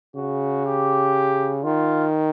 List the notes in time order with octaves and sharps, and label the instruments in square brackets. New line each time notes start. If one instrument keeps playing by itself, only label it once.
[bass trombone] C#3 [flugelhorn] F#4
[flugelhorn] G4
[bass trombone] D#3 [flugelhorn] F4